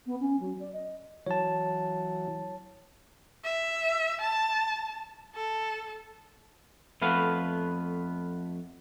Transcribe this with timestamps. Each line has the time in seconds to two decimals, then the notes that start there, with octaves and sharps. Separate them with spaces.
0.06 B3
0.20 C#4
0.40 F#3
0.59 D5
0.73 D#5
1.26 E3 F#3 C#5 A5
3.44 E5
4.22 A5
5.35 A4
7.02 F2 A3 B3 B4 F5